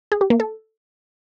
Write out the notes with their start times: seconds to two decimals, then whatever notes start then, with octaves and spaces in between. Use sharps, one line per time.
0.12 G#4
0.21 G4
0.30 A#3
0.40 A4